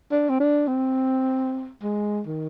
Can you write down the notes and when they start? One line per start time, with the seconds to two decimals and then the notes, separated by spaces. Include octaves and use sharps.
0.11 D4
0.29 C4
0.40 D4
0.68 C4
1.82 G#3
2.26 D#3